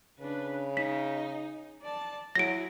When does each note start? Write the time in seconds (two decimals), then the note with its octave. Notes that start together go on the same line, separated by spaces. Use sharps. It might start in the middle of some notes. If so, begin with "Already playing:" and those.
0.20 C#3 D4 B4
0.77 D#4 B6
1.82 D5 A5
2.35 F#3 E4 G#4 A#6 D7